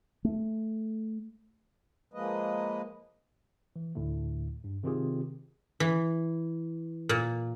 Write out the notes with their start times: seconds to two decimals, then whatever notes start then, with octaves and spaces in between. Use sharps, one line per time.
0.24 A3
2.14 F3 G#3 A#3 B4 D#5
3.76 E3
3.95 D2 A2 D3 A3
4.64 G2
4.83 C3 D#3 C4 F4 G4 G#4
5.80 E3
7.09 A#2